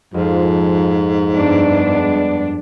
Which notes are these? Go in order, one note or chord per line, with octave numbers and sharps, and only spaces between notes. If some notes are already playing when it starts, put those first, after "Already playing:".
F2 G#2 F3 F4
G2 G#3 B3 D4 D5